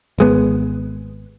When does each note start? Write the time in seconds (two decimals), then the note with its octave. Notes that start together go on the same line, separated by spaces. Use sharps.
0.18 G#1 G#3 B3